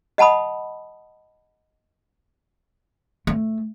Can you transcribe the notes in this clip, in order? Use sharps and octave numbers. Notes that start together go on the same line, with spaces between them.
D#5 F#5 A5 B5 D#6
A3